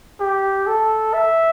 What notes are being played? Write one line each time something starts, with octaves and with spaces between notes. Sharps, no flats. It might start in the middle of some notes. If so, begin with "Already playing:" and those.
G4
A4
E5